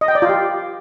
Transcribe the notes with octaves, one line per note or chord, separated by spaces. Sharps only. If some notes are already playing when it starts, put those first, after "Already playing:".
D#5
G5
D5
F4
G4